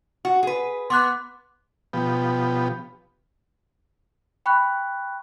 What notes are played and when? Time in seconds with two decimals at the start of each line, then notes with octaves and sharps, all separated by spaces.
0.25 F#4
0.43 G#4 B4
0.90 B3 C6 D6 F#6
1.93 B2 F3 B3 G4
4.46 G5 B5 C#6 F#6